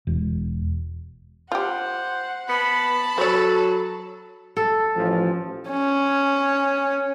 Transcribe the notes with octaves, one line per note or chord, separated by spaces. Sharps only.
E1
F4 G4 C5 F#5
B3 A5 B5
F#3 A4 C5 C#5
A4
A1 F3
C#4